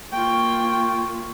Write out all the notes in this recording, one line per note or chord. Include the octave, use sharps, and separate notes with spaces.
A#3 F4 G5 C#6